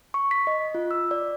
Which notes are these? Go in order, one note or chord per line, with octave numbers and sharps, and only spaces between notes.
C#6
B6
D#5
F4
E6
D5